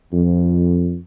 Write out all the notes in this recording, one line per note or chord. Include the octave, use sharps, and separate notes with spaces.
F2